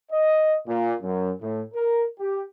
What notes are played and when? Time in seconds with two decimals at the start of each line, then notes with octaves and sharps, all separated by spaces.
0.11 D#5
0.66 A#2
1.01 F#2
1.40 A2
1.74 A#4
2.19 G4